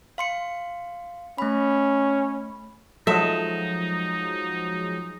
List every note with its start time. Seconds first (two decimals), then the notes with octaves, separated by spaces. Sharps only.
0.18 F5 C6 C#7
1.38 A3 C#4 B5
3.07 F3 F#3 G#3 D#4 A4 D#5 E5